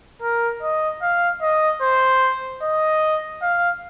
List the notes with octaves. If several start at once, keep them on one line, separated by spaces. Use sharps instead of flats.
A#4
D#5
F5
D#5
C5
D#5
F5